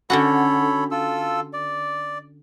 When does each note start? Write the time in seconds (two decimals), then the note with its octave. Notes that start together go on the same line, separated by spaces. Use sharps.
0.10 D3 C#4 F#4 A4 C#5 B5
0.91 F4 A4 E6
1.53 D5